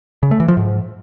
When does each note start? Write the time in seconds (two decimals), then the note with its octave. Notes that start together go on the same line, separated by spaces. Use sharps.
0.23 C#3
0.31 A3
0.40 E3
0.48 F3
0.57 G#2